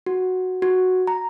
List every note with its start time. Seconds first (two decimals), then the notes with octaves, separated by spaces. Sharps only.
0.06 F#4
0.62 F#4
1.07 A#5